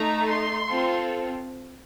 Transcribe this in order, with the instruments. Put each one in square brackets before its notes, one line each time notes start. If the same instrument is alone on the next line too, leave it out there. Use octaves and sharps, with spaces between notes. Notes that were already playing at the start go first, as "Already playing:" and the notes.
Already playing: [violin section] A3 D#4 A4 A#5
C6
C4 F4 A4